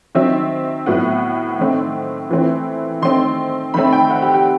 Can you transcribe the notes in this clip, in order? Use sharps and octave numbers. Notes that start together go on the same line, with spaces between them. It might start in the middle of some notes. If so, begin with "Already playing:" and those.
D#3 F#3 C4 E5
A2 F#3 B3 F#5
D#3 A3 C4
E3 A3 C4
D#3 A3 C4 C6
D#3 A3 C4 B5
G5
F#5
G4
G4